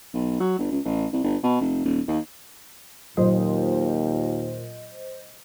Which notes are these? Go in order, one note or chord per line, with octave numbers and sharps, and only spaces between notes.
B1
F#3
G1
C#2
A1
C2
G1
B2
F1
D#1
D#2
D#2 A#2 F#3 C5 D#5